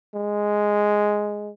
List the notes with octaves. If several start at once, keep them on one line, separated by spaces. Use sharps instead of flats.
G#3